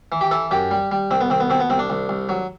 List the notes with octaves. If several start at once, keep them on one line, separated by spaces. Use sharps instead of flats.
E3
G4
E3 A4
F#2 G4
G3
G3
C2 C4
B3
C2 C4
B3
B2 C4
B3
C2 C4
D4
C2
C2
F#3